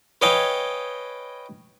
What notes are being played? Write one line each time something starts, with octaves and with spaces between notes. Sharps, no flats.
B4 C#5 D#5 F5 G5 G#5